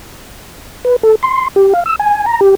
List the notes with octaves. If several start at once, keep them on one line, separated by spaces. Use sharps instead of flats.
B4
A4
C6
G4
F5
E6
G#5
A#5
G4